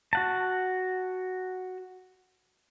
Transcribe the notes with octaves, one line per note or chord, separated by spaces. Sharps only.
F#4 F#5 A5